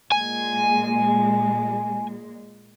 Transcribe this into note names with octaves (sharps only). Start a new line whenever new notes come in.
A#2 G#3 G#5